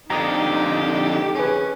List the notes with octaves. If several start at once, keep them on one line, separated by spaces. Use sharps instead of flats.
F2 D3 D#4 G4 A#5 D#6
C#4 G#4 B4